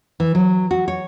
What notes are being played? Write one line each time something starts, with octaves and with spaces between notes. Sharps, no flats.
E3
F#3
F#4
C#5